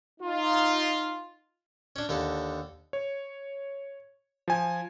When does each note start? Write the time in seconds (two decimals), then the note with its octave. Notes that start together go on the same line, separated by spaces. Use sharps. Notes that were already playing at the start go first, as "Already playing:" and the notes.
0.21 D#4 F4
1.96 C#4 D4
2.09 D#2 D3 A4
2.93 C#5
4.48 F3 G#5